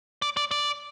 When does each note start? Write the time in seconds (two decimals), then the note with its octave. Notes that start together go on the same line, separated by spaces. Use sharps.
0.22 D5
0.37 D5
0.51 D5